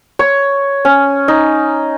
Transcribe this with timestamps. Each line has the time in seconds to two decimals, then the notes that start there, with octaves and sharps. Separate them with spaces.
0.19 C#5
0.85 C#4
1.28 D#4